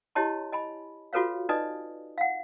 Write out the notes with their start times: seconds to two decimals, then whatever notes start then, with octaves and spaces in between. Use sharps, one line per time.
0.15 E4 G4 C#5 D#5 A5 C6
0.53 D#5 G#5 B5
1.13 F4 F#4 A4 B4 C#5 F5
1.49 D#4 B4 D5 D#5 G#5 D#6
2.18 F5 F#5